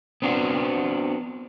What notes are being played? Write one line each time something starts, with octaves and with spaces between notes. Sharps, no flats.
B3 C4 D4 F#4